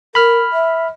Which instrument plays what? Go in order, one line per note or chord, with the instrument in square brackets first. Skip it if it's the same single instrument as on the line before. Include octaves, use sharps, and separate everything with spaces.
[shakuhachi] A#4 [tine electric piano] B5 F6
[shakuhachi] E5